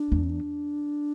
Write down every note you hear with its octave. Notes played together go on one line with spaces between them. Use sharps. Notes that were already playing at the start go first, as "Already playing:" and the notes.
Already playing: D4
E2
C#4
D4